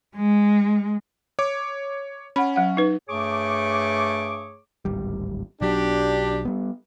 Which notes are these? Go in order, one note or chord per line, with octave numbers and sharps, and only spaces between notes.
G#3
C#5 D6
C#4 F#5 B5
F#3 F#5
D#4 B4
G2 A3 G#4 C#5 C#6 D6
D1 G#1 G3
B1 F#3 D4 G4
G3 B3